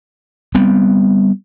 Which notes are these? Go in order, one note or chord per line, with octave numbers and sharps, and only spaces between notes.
G3 B3 C4